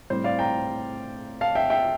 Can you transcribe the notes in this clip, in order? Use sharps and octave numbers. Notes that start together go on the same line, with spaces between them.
A2 G3 C4 C5
D5 F5
G5 A#5
F5 A5
E5 G5
E5 G5